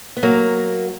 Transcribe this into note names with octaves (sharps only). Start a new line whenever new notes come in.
B3
F#3 A#3